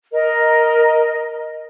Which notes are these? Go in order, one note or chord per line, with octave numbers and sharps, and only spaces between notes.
A#4 D#5